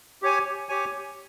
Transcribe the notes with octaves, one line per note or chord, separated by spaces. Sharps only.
G4 C#5 G#5
G4 C#5 G#5